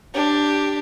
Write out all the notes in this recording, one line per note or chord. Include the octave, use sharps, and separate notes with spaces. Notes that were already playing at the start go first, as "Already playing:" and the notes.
D4 G4